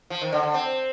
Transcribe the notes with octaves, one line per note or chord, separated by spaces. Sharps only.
F3
D#3
D3
D3
C4